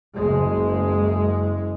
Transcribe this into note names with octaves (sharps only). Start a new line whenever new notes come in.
F#1 G#3